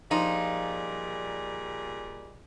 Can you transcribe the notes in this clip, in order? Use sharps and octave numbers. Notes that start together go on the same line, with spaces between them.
A#2 F3 G3 D#4 F4 G#4